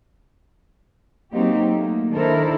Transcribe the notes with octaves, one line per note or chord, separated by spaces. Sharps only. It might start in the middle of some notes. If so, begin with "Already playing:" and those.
F#3 A#3 C4 D#4 G4
A3 A#3
D#3 D4 E4 A4 A#4 C5